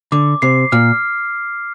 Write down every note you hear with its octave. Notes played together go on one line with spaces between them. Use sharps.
D3 D6
C3 C7
A#2 F6